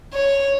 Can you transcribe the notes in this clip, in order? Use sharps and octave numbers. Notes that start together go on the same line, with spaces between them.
C#5